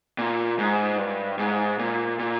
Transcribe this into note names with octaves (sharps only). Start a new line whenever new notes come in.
A#2
G#2
G2
G#2
A#2
A#2